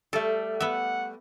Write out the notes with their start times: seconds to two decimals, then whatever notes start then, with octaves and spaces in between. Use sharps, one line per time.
0.13 G3 A3 A4
0.60 B3 E5 F#5